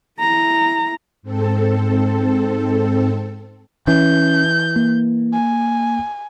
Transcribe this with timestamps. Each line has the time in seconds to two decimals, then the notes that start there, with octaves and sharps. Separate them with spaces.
0.20 E4 A#5
1.23 G#2 C4 A4
3.87 E3 C#4 G6
4.76 A#3
5.34 G#5